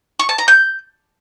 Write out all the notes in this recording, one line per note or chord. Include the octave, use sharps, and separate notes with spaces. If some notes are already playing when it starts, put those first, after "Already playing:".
C#6
A5
A#5
G6